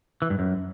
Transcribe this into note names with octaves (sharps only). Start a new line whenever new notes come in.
E3
G2
F#2